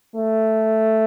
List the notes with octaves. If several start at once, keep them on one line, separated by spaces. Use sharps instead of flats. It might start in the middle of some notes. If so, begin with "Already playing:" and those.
A3